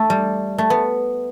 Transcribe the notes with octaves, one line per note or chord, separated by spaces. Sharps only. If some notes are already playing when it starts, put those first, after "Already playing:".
Already playing: A3
G3
A3
B3